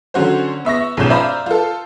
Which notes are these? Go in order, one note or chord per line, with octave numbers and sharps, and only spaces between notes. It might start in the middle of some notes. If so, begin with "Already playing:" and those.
D3 F#3 C#4 F#4 C5
B3 E5 C#6 A#6
B1 G#2 F3 C#4 G6 E7
C5 D5 E5 F5 A#5 B5
F4 A4